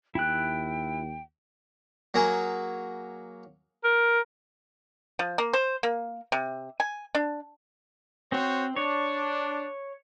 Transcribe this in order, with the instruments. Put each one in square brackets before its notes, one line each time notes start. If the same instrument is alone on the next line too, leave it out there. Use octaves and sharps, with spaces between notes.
[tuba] D#2 [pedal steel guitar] E4 F#6 [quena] G5
[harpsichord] F#3 A#3 G#4
[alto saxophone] A#4
[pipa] F3
A#3
C5
A#3
C3
G#5
D4
[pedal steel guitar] C4 [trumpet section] F#4 C5 C#5
[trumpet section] D4 [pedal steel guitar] C#5